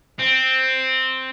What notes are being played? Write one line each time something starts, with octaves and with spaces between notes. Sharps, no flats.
C4